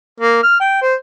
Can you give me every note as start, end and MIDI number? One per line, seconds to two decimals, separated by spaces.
0.20 0.41 58
0.43 0.55 89
0.60 0.81 79
0.82 0.94 72